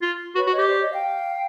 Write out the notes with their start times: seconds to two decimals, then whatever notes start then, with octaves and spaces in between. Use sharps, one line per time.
0.02 F4
0.35 F#4 B4 C#5
0.47 F#4
0.52 C#5 D#5
0.58 G4
0.69 C5 D5
0.80 C#5 D#5
0.92 F5 G5